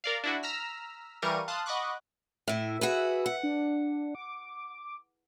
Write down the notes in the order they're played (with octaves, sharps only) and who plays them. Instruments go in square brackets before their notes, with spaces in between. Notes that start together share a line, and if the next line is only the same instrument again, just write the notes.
[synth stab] A#4 D5 F5
D4 E4 F#4
A#5 E6 F6 B6
E3 G3 A#4 F5 C#6 D#7
F5 A5 C6 D#6 F#6
D#5 F#5 B5 C#6 D6 F#6
[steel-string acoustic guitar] A2 E4 [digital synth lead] E5
[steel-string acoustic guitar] F#4 G#4 B4
F#5
[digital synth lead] D4
D6